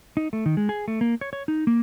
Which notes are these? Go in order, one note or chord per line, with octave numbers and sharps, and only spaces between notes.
D#4
A3
D#3
G#3
G#4
A3
A#3
C#5
C#5
D#4
A#3